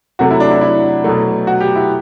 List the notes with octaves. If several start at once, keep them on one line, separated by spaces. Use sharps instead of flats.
C3 F#3 A3 F#4
E4
D4
E4
E4
B2 F#3 A3
F#4
G4
E4